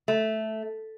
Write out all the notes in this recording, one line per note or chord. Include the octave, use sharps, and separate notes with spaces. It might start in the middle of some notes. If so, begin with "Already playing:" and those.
A3